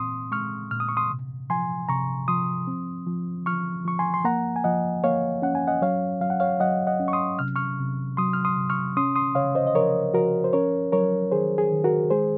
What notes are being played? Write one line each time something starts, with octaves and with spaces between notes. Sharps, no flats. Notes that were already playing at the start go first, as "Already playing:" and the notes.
Already playing: A#2 C4 C6 D#6
G#3 C#6 F6
A#2 F6
D#6
C#6
C6 D#6
C3
F3 G#5 C6
C3 A#5 C#6
F3 C6 D#6
C4
F3
F3 C#6 F6
F3 C#6
G#5 C6
C6
A#3 F#5 A#5
G#5
F3 D#5 F#5
A#3 C#5 F5
C#4 F#5
G#5
D#5 F#5
F#3 C#5 F5
F#3 F5
F#5
C#5 F5
F#3 D#5 F#5
D#5 F#5
C#4
C#6
C6 D#6
C3 F6
C#6 F6
C3
F#3 C6 D#6
F6
C6 D#6
C3
C#6 F6
C#4 C6 D#6
C6 D#6
C#3 C#5 F5
C5 D#5
D#5
F3 A#4 C#5
F3 F#4 A#4
C5
C#4 A#4 C#5
F#3 A#4 C#5
D#3 G#4 C5
G#4
D#3
F#4 A#4
G#3 G#4 C5